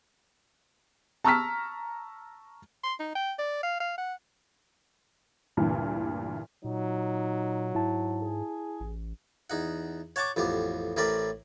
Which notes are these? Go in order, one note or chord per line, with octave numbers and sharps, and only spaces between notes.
A5 A#5 C#6 E6 F6 B6
C6
D#4
G5
D5
F5
F5
F#5
D2 G2 A#2 E3
A#2 F#3 D#4
G#2 E4 A5
G#4
A1
E2 D#4 F#5
C#5 F#5 A5 C#6 D6
A1 F2 B3 G4
A1 A2 C4 A#4 D5 B5